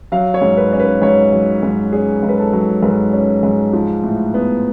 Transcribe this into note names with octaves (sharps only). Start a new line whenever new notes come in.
F#3 F5
C#5
G#2
B4
C#4
B4
G#2 C#5
F#3
G#2
C#4 G#4
G#2
B4
A4
F#3
G#2 B4
C#4
G#2
F3
A2
B3